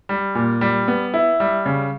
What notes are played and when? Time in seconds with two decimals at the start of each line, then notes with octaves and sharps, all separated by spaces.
0.09 G3
0.35 A#2
0.61 G3
0.88 B3
1.14 E4
1.40 G3
1.66 C#3